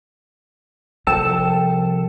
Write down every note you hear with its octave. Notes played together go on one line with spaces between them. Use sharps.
C2 F3 A4 G5 A5 E6